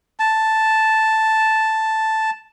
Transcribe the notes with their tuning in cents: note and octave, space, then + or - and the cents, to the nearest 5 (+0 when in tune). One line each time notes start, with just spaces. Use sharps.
A5 +0